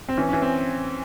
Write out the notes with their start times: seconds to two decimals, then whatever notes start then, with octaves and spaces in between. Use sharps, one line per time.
0.09 C4
0.17 E3 C#4
0.29 E3 C#4
0.42 C4